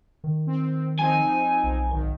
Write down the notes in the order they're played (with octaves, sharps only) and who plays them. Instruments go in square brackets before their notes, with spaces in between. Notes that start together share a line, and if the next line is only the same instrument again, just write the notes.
[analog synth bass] D#3
[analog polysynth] C4
[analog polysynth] F3 C4 D#4 [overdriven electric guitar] G#5
[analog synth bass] B1
[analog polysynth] G#1 D#3